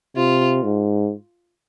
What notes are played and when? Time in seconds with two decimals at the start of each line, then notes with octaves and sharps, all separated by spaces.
0.16 C3 F4
0.63 G#2